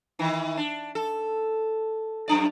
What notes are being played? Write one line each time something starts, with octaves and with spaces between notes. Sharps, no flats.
D#3 E3
D4
A4
F#2 D4 D5